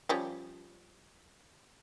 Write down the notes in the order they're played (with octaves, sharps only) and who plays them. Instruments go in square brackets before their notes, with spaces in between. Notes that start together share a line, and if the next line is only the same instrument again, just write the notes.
[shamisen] F3 G3 C#4